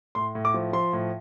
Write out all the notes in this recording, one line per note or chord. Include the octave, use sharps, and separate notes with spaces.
A2 C6
A2
D6
F3
F3 C6
A2